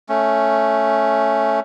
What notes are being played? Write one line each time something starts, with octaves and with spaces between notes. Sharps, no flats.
A3 C#4